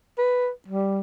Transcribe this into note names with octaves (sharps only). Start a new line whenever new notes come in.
B4
G3